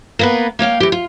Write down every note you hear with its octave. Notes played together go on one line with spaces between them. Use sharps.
A#3 B3 B4
A#3 C#5 F5 G5
E3 G4
F4